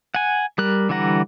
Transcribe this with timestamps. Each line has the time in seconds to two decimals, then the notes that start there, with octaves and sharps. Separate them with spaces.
0.15 F#5 G#5
0.58 G3 A#4 F#6
0.89 D3 E3 G3 F#5 A#5